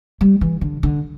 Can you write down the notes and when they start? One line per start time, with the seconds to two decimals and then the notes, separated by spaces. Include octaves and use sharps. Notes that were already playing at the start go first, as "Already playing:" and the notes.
0.21 G3
0.41 E3
0.61 D3
0.83 D3